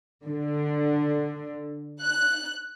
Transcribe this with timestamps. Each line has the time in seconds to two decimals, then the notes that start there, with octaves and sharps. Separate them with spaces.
0.26 D3
2.01 F#6